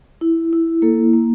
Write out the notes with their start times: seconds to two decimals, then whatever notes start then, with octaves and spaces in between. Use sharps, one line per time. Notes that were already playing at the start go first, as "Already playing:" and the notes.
0.21 E4
0.53 E4
0.82 A#3 A4
1.13 A#3